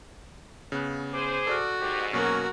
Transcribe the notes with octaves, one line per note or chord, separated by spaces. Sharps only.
C#3 B3 F#6
G#4 C5 D6
F#4 A4 D5 F6
G#2 G4
B2 F#3 A#3 C#4 F#4 A#4